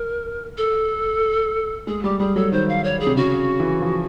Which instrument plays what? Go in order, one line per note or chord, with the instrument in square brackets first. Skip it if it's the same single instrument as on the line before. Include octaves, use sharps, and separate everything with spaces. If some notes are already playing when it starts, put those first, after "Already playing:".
Already playing: [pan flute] A#4
A4
[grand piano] G#3 [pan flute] G#4
[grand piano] G3 [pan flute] G4
[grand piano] G3 [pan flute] G#4
[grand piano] F#3 [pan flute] A4
[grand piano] D#3 [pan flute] C5
[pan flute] F5
C#5
G#4
[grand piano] C3
[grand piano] C#3 [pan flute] F#4
[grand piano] E3
F3